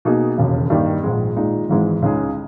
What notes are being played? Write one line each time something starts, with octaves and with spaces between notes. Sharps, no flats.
B2 A#3 D#4 G#4
E1 D#2 C#3
G2 D#3 G3 A#3 D#4
A#1 G#2 D#3 G#3
A#2 G#3 D#4
G#1 G#2 E3 G#3
C#2 C#3 G#3 D#4 G#4